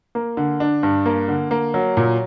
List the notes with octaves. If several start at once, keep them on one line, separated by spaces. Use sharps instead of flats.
A#3
D3
D4
G2
A#3
D3
A#3
F#3
A#2